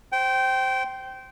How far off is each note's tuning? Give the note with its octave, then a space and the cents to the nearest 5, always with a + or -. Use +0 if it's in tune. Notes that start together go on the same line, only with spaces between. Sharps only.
C5 +0 G5 -20